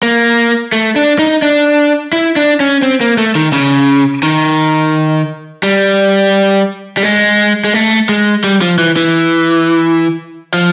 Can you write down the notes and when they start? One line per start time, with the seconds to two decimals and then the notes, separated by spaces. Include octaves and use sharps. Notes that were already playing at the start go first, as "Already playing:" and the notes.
0.03 A#3
0.72 A3
0.96 D4
1.19 D#4
1.42 D4
2.13 E4
2.36 D4
2.60 C#4
2.82 C4
3.01 A#3
3.17 A3
3.35 D#3
3.53 C#3
4.23 D#3
5.63 G3
6.97 G3
7.03 G#3
7.65 G#3
7.74 A3
8.09 G#3
8.44 G3
8.61 F3
8.78 E3
8.96 E3
10.54 F3